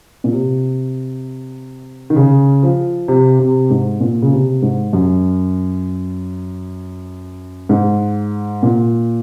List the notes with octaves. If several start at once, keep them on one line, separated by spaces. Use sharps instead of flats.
A#2
C3
D#3
C#3
F3
C3
C3
G#2
A#2
C#3
C3
G#2
F#2
G#2
A#2